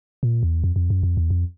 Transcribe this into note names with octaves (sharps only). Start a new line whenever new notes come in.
A#2
E2
F2
F2
F#2
F2
E2
F2